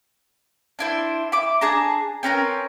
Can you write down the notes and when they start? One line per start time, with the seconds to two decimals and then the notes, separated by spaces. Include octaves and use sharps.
0.79 D4 E4 C5
1.32 E5 B5 D6
1.61 D4 G#4 A5 A#5
2.23 C4 C#4 A#4 B4